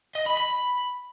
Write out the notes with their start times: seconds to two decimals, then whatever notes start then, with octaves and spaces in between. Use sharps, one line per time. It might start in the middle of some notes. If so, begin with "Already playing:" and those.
0.15 D#5
0.26 B5
0.37 B5